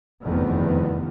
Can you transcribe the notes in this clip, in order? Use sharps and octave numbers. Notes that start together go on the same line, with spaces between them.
F1 E2 G2 D#3 F3 B3